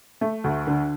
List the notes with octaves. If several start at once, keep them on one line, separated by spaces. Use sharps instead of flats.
A3
D2
D3